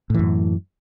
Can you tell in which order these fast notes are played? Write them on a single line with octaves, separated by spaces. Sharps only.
A2 E3 F#2